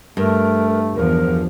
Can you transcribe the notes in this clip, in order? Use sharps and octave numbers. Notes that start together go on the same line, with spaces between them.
G2 A3 A#4
E2 F3 A#4